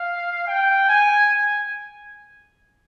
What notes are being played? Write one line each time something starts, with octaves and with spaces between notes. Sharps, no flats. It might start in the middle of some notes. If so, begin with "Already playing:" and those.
Already playing: F5
G5
G#5